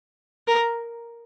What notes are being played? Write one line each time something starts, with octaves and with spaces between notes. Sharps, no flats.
A#4